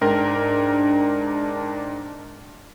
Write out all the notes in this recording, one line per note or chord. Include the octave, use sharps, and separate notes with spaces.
G#2 D4 A#4 G5